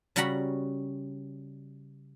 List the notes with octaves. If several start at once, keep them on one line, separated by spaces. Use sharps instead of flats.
C#3 G3 F#4 F#5 A#5 B5